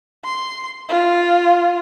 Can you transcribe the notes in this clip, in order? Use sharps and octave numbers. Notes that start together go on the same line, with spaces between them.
C6
F4